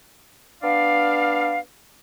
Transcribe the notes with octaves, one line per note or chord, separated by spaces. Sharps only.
B3 D4 D5 F5